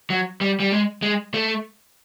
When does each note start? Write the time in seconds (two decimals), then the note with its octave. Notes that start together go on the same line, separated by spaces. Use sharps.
0.10 F#3
0.41 G3
0.60 G3
0.72 G#3
1.02 G#3
1.34 A3